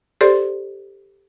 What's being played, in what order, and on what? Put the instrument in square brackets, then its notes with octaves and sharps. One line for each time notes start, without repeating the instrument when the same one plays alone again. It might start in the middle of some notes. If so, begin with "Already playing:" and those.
[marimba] G4 A4 C5 D5 C6